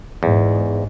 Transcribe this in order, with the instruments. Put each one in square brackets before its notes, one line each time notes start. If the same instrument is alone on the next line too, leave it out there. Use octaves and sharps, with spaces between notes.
[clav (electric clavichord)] E2 [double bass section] G#2